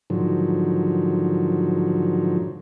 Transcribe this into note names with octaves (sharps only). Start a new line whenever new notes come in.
G#2 D3 D#3 F3 F#3